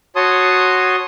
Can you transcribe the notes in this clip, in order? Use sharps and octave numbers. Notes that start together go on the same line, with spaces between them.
F#4 C#5 A5 C6 D#6